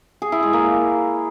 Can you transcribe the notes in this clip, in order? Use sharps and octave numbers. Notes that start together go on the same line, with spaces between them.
G#4
E4
G#3
A#3